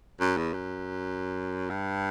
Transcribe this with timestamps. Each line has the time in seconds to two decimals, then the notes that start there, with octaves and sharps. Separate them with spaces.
0.20 F#2
0.37 E2
0.54 F#2
1.70 G2